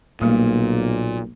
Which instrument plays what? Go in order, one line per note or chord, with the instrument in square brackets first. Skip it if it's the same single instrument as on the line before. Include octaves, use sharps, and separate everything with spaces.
[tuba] B1 [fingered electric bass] A#2 [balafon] G3 A3 A#3